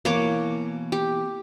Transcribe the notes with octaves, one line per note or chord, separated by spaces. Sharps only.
B2 E3 A#3 C#5 D6
G4